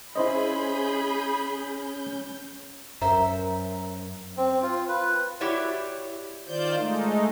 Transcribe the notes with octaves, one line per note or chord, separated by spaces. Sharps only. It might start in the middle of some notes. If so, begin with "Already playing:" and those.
C#4 E4 G#4 C5 D#5 B5 G6
F#2 A#4 C5 E5 A#5
C4
F4
B4
E4 F#4 G4 C#5 D5 E5
D#3 F4 C5 D5 G6
G#3 A3 D#4